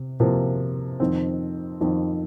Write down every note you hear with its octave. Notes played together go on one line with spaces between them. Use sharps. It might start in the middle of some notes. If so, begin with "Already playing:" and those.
Already playing: C3
C3 F3 A#3
F2 D#3 C4
F2 D#3 C4